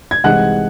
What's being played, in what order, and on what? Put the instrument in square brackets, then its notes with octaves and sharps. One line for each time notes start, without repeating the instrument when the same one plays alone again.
[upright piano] G#6
C2 C3 E3 G#3 D#4 F#5 F#6